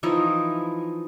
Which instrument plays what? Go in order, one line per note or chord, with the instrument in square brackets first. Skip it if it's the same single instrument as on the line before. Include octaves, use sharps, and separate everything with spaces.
[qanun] E3 F3 D#4 E4